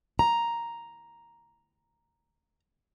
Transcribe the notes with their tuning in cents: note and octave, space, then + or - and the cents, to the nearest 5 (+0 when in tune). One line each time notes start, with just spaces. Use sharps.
A#5 +0